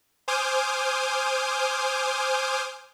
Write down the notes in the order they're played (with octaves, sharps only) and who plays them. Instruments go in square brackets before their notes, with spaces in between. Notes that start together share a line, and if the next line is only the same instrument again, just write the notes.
[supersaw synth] C5 G#5 D6 D#6 F6 G6